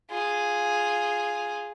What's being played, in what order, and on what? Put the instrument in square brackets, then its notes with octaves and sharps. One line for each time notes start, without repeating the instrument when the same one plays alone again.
[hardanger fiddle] F4 G#4